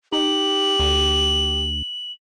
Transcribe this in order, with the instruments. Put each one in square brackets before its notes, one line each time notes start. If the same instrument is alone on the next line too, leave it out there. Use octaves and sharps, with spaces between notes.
[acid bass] D#4 [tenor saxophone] G4 [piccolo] F#7
[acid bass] D2